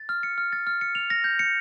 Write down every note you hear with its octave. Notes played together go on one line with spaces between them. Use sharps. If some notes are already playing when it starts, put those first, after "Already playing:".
Already playing: A6
F6
C#7
F6
A6
F6
C#7
F7
A#6
G6
C#7